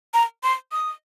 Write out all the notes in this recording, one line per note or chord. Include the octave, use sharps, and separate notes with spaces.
A#5
C6
D#6